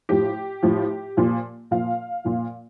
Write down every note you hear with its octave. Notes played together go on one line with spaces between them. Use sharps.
A2 F3 G4
A2 F3
A#2 F3
A#2 F3 F5
A#2 F3